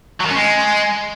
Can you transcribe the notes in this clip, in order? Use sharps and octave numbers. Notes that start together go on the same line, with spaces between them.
F#3
D#3
C#4
G#3